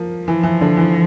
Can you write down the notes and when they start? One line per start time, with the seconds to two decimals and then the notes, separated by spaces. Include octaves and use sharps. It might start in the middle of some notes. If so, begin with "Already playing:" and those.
Already playing: F3 A#3
0.27 E3 F3
0.43 E3
0.61 D3
0.77 E3